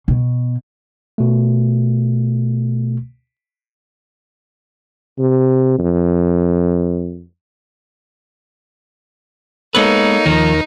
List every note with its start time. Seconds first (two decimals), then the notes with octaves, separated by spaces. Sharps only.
0.08 B2
1.18 B2 A3
5.19 C3
5.78 F2
9.75 G#3 A#3 B3 D#4 A4 B4 C#5
10.26 D#2 D#3 F3 A#4